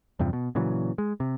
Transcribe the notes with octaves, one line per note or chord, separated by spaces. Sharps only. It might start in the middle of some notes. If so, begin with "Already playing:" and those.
E2 G2 C3 F3
B2
A#2 C#3 E3 F#3
G#3
C3